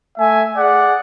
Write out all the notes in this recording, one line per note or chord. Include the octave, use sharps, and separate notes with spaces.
A3 E5 G#5
G#4 D5 F#5